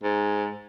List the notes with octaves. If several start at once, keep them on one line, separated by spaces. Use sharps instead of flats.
G#2